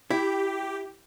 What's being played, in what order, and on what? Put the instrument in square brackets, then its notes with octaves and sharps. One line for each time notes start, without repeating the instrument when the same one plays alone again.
[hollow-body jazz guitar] E4 [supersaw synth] G4